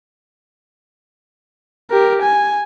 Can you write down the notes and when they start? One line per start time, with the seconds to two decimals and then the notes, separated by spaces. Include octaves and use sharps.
1.91 G4 A#4
2.22 G#5